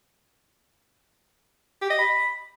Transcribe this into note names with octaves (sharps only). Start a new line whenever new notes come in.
G4
D#5
B5